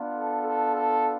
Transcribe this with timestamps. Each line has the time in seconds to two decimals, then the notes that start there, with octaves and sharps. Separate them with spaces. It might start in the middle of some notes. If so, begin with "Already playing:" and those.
Already playing: B3 D4 F4
0.15 A4
0.45 A4
0.76 A4